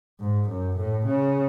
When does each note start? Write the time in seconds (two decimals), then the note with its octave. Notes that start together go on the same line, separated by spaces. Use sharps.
0.20 G#2
0.49 F#2
0.77 A2
1.06 C#3